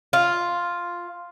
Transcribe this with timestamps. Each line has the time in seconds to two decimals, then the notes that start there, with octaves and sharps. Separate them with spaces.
0.13 F4